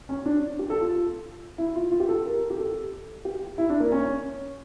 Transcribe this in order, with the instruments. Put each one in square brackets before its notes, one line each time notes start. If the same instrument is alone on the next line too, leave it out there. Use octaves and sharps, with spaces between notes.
[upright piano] C#4
D4
G4
A4
F4
E4
F4
F4
G4
A4
A#4
G4
A4
G4
E4
D4
A#3
C#4